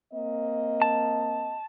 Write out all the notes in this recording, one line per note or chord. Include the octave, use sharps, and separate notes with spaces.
A#3 C4 D#5
A5